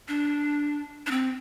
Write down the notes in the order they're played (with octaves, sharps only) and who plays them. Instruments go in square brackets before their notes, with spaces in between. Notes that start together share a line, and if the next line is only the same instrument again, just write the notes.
[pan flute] D4
D4
C4